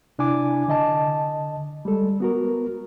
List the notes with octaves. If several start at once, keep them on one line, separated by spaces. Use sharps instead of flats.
C3 D4 E4 G#5 D6
D3 D#5 A5
G3 G#3 A4
B3 F#4 A#4